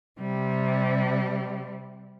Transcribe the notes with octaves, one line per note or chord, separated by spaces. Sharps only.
C3 G3